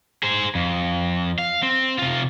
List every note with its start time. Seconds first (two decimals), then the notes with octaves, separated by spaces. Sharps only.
0.23 G#4 C5
0.55 F2
1.38 F5
1.62 C4
1.99 C3 F4